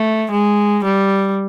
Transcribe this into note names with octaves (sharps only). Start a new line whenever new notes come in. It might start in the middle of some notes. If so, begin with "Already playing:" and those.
Already playing: A3
G#3
G3